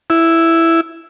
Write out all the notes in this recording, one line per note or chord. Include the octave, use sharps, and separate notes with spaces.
E4